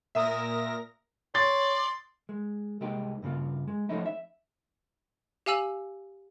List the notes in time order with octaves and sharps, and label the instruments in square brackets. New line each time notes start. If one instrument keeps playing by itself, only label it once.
[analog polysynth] A#2 A#4 A#6 [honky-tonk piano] E5 D#6
[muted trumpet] C#5 [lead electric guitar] D5 [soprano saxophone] C6 [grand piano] A6
[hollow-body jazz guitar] G#3
C2 G#3 A#3 D#4 G4
G2 C#3 A#3 F4
G#3
F3 A3 C4 C#4 D#4 E4
E5
[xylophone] G4 F5 G#5 E6 F#7